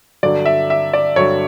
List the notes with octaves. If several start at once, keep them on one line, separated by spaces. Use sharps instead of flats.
G2 D3 F#3 D5
E5
E5
D5
G2 D3 F#3 C#5